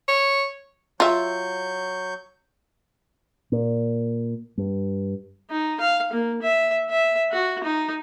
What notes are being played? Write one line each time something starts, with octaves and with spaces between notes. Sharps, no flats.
C#5
F#3 F4 E5 C#6 G6
A#2
G2
D#4
F5
A#3
E5
E5
F#4
D#4